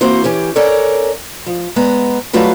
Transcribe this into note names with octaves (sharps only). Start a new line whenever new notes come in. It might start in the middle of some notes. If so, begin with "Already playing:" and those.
E3 A#3 C4 F#4 C5
E3 C#4 G4
C#4 A4 A#4 C#5 D5
F3
G#3 B3 A#5
F#3 G3 A3 F4 F#4 B4